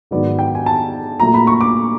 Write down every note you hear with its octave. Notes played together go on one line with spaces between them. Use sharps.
G#2 D#3 F#3 B3 D5
G5
G#5
A5
A#2 F#3 A3 A#5
B5
C#6
D6